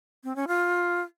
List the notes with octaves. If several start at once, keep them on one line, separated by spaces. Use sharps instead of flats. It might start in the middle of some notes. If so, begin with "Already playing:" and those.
C4
C#4
F4